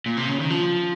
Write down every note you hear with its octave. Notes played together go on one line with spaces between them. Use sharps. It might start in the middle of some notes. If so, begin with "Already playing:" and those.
A#2
C3
C#3
D#3
F3